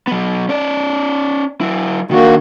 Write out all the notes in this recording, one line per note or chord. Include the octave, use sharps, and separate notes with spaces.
F#3 B3
C#4 D5
F#3 E4
D#3 A#3 D4 F#4